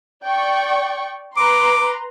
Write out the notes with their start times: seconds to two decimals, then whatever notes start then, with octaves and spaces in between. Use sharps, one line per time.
0.25 D5 G5 C#6
1.37 B4 A#5 C6 D6